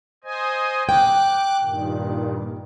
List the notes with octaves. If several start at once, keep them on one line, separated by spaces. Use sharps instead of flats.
C5 D#5 G#5
G5 D6 F#6
G2 A#2 D#3